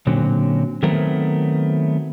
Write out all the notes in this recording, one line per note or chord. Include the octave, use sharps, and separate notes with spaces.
A#2 D3 F#3 C4 C#4
D#3 F#3 A3 B3 C4 A#4